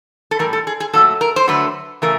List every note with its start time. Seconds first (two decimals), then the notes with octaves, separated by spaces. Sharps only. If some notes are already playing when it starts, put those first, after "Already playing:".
0.31 A4
0.39 A2 E3 G3 A#4
0.53 A4
0.67 G#4
0.80 G#4
0.93 A#2 F#3 A3 A4
1.21 A#4
1.36 C5
1.47 D3 F#3 A3 B4
2.02 C#3 E3 A3 A#4